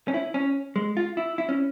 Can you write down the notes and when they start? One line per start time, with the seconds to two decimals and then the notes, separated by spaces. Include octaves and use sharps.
0.08 C#4
0.14 E4
0.34 C#4
0.76 G#3
0.97 F4
1.17 E4
1.38 E4
1.49 C#4